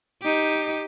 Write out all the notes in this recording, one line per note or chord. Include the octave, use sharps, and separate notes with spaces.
D#4 G4